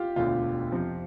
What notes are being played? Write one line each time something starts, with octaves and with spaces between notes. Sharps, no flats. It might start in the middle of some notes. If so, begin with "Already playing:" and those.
Already playing: F4 G4
E1 D2 D3 F4
F2 C3 F3 C4